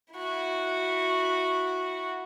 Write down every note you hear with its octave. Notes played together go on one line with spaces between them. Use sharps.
E4 F#4